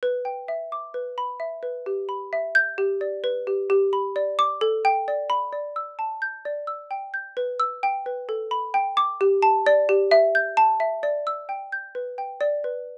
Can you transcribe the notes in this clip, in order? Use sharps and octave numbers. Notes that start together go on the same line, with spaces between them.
B4
G5
E5
D6
B4
B5
E5
B4
G4
B5
E5
G6
G4
D5
B4
G4
G4
B5
D5
D6
A4
G5
D5
B5
D5
E6
A5
G6
D5
E6
G5
G6
B4
E6
G5
B4
A4
B5
G5
D6
G4
A5
D5
G4
E5
G6
A5
E5
D5
E6
G5
G6
B4
G5
D5
B4